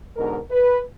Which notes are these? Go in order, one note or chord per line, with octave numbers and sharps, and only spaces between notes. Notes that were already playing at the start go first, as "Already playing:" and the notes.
G#2 B2 D3 A#4
B4